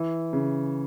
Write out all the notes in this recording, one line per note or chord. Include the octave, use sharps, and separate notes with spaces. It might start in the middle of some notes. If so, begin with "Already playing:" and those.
Already playing: E3
C#3